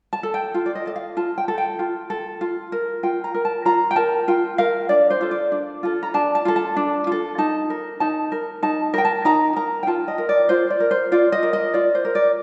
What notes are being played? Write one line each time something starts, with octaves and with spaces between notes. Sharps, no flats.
A5
A4
G5
F4
D5
D#5
A4 D#5
F5
F4 A5
G5
A4
G5
F4
A4
F4
A#4
F4 G5
A#5
A#4
A5
F4 A#5
G5
A#4 A5
F4 G5
A#4 F5
D4 D5
C5
F4 A4
D5
D4
F4 A4
A#5
D4 A5
A5
F4 A4
A5
D4
F4 A4
D#4 A5
A#4
D#4 A5
A#4
D#4 A5
A#4 G5
A5
D#4 A#5
A#4 A#5
G5
F4 A5
D#5
A#4
D5
F4 C5
D5
A#4
C5
F4 D5
D#5
A#4
D#5
F4 D5
C5
A#4
D5